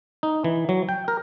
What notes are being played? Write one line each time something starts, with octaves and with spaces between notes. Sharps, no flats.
D#4
E3
F#3
G5
A#4